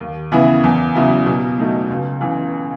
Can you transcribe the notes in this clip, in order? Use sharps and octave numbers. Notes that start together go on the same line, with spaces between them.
D#2
C#3 E3 B3 E4
E2
C#3 F#3 B3 E4
B2
F#3 A3 D#4
C#2
C#3 E3